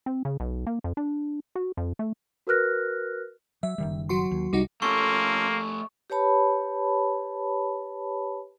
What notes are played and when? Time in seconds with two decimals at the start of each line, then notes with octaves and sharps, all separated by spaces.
0.06 C4
0.25 C#3
0.40 B1
0.67 A#3
0.84 F2
0.97 D4
1.55 F#4
1.77 F2
1.99 A3
2.47 F#4 A#4 B4 F6 F#6 A#6
3.63 F#3 E5
3.78 F#1 D#3 G3
4.09 F#3 F#4 C6
4.31 D#2
4.53 C2 G3 D#4 F#4
4.82 A3 A#3 C#4 F4 G4 A4 C#6
6.10 G4 B4 C#5 A5 B5